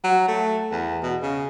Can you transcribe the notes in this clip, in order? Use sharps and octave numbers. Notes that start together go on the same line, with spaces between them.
F#3
A3
E2
B2
C#3